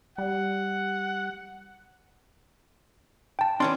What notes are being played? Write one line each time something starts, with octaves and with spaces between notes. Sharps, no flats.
G3 F#5
G5 A5
E3 C#4 D4 C6